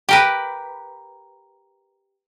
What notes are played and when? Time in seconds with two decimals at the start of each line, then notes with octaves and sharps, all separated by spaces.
0.09 G4 A#4 B4